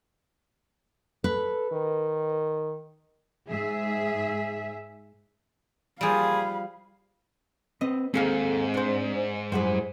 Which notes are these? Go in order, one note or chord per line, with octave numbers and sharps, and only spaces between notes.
A4 B4
D#3
G#2 G#4 E5
A#2 F3 G3 G#4 F5 B5
C4 B4 D#5
D#2 G#2 C4 G#4 A4 F5
D4 C5
F#2 G3 E4 G#4 C5 F#5